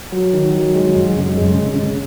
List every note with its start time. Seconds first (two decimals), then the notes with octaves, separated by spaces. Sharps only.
0.12 F#3
0.33 D#3
0.54 F#3
0.75 G#3
0.96 F#2
1.17 C#3
1.37 G#3
1.58 C#3
1.79 C#3